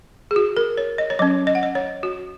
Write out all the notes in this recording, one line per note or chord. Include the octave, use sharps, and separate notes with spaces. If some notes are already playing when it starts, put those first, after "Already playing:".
G#4
F#4
A#4
C#5
D#5
C#5
F#3 C#4 D#5
D#5
F#5
D#5
C#5
F#4